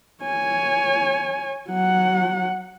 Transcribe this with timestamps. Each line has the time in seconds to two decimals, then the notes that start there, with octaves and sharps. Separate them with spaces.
0.24 C#5 G#5
1.70 F#3 F#5